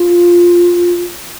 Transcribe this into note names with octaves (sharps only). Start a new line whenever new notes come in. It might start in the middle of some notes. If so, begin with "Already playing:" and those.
Already playing: F4